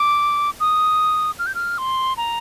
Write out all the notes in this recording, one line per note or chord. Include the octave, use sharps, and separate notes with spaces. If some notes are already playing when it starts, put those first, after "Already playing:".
Already playing: D6
D#6
F6
G6
F6
C6
A#5